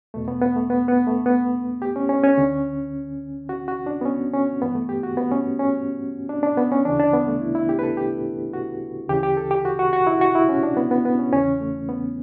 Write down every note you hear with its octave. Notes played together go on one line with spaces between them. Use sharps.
E2 B2 A3
B3
B3
A3
B3
B3
A3
B3
G4
C#4
C#4
C#4
D2 D3
F#4
F#4
D4
B3
C#4
C#4
G2 E3 B3
A3
G4
F#4
B3
C#4
C#4
D4
D4
B3
C#4
D2 C#3 E3 D4
D4
B3
A3
E4
E4
G4
B4
A4
G4
F#4
D2 C#3 E3 G4
G4
A4
G4
F#4
F#4
F#4
E4
F#4
E4
C#4
D4
B3
B3
B3
C#4
E2 C#3 E3 C#4
A3
B3